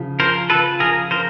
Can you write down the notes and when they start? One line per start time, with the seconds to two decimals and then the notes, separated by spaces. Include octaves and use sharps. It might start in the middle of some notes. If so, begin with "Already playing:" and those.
Already playing: C#3 F3
0.19 F3 A#4 C5
0.50 F3 A4 B4
0.80 F3 G#4 A#4
1.11 F3 A#4 C5